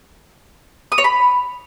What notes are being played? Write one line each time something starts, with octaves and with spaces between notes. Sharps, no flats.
D#6
C#5
B5